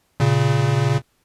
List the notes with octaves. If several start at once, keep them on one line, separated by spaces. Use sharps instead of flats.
A#2 C#3